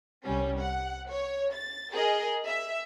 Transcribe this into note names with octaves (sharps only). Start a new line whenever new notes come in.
C2 G3 C#4
F#5
C#5
A6
G#4 A#4 D#5
E5